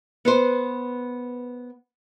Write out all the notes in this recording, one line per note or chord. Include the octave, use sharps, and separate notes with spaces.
B3 B4 C5